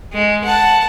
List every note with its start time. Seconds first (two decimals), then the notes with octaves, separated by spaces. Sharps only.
0.13 G#3
0.44 F#5 A5